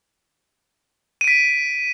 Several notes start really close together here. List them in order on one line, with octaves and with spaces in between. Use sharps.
D#7 D7 B6